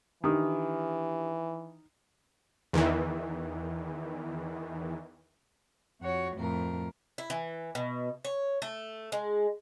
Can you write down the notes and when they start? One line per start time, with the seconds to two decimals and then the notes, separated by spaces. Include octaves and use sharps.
0.24 D#3 E3 D4 G4 D#6
2.73 E2 D#3 E3
6.01 F2 F#4 C#5
6.36 F2 A2 A#4
7.18 E4
7.30 E3
7.75 B2
8.25 C#5
8.62 A3
9.12 G#3